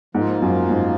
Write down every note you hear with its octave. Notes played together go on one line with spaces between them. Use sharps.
G#2 F3 A#3 F4
F#2
G#2